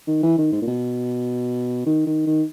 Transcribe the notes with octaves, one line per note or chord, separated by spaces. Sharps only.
D#3
E3
D#3
G#2
A#2
B2
D#3
D#3
D#3